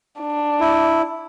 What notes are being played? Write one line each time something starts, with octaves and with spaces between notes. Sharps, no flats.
D4
E4